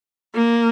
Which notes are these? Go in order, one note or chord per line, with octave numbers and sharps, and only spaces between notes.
A#3